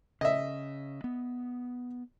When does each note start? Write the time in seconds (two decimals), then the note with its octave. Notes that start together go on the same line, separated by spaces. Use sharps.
0.21 C#3 D#5 E5
1.04 B3